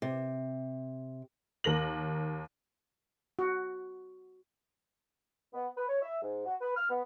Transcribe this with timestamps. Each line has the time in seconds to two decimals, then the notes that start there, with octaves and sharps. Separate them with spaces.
0.02 C3
1.64 D#2 A#4 A#6 F#7
3.39 F#4
5.54 B3
5.77 B4
5.89 C#5
6.02 E5
6.23 G#2
6.46 F#4
6.61 B4
6.77 F6
6.90 B3